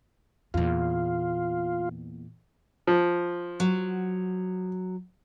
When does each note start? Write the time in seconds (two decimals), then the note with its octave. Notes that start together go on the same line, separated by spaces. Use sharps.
0.54 E2 A#2 F4
2.87 F3
3.60 F#3